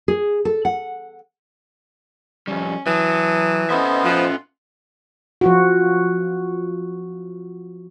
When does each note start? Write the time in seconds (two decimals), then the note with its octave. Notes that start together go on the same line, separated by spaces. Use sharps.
0.08 G#4
0.45 A4
0.65 F#5
2.48 F2 G3 C#4
2.87 E3 F#3 A5 D#6
3.70 B3 C#4 A4 C5 D#5 E5
4.04 F3 F4 F#5
5.41 F3 F4 F#4